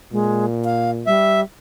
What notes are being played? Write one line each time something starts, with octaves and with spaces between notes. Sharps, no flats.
A#2 G#3
F5
G3 E5